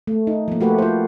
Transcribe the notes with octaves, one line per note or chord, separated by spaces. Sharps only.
A3
D#4
F3 A#3
A3 F#4 G4 B4
F4 C5